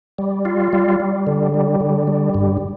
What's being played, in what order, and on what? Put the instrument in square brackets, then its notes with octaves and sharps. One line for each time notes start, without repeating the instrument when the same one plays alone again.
[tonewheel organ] G3
F4
G3
G3
D3
G3
D3
G3
G2